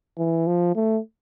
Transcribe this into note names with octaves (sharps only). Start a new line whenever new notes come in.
E3
F3
A3